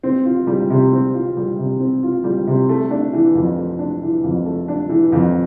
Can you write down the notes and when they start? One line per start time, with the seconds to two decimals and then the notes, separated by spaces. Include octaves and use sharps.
0.03 C4
0.25 F4
0.47 G3
0.70 C3
0.92 C4
1.14 F4
1.37 G3
1.58 C3
1.80 C4
2.03 F4
2.24 G3
2.47 C3
2.69 A3
2.91 D4
3.13 E3
3.35 F2
3.57 A3
3.79 D4
4.02 E3
4.24 F2
4.46 A3
4.68 D4
4.90 E3
5.12 F2